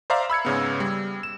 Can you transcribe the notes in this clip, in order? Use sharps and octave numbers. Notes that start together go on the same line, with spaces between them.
C5 D5 E5 F5 A#5 D6
B5 E6 G#6 C#7
G#2 C#3 B3
G3
E7